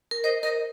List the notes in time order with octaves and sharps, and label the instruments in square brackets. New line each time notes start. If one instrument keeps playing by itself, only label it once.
[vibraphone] A#4
[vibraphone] C5 [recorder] D#5
[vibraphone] A#4 [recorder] D#5